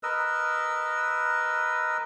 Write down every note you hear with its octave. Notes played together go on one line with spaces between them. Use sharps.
A#4 B4 D#5 E6